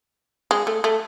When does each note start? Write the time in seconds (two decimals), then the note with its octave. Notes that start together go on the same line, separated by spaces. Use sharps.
0.51 G#3
0.67 A3
0.84 A3